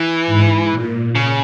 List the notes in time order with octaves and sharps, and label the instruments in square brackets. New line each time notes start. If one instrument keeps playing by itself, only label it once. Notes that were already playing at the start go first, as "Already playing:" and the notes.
Already playing: [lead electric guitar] E3
[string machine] G#2
A#2
[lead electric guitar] C#3